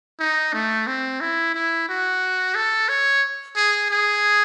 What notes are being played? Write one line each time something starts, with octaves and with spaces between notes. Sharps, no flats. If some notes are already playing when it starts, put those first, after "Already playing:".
D#4
A3
C4
E4
E4
F#4
A4
C#5
G#4
G#4